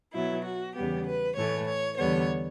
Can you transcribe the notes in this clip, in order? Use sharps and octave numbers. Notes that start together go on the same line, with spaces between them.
B2 F#3 B3 E4
F#4
E2 C#3 G3 B3 G4
B4
A2 E3 A3 C#5
C#5
E2 D3 G3 B3 C#5